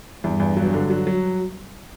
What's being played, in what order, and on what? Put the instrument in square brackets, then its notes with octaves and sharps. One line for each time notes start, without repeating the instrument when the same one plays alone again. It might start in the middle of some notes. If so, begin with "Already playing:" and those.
[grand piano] E2 [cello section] G2
[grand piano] E2
F#3
D3
F#3
F#3